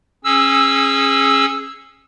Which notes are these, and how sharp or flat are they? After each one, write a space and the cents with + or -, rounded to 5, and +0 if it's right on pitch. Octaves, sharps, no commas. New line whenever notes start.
C#4 -25 G#4 +0 E6 +0